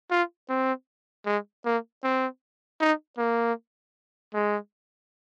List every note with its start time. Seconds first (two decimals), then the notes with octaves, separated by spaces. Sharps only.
0.11 F4
0.49 C4
1.26 G#3
1.65 A#3
2.04 C4
2.80 D#4
3.18 A#3
4.34 G#3